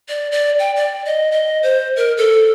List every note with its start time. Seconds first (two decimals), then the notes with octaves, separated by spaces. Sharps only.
0.09 D5
0.31 D5
0.59 G5
0.76 D5
1.05 D#5
1.31 D#5
1.63 C5
1.97 A#4
2.17 A4